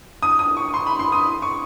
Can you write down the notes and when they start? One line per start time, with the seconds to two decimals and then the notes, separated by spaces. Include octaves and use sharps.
0.23 D#6
0.39 D#6
0.57 C#6
0.74 C6
0.87 B5
0.99 C6
1.12 D#6
1.42 C#6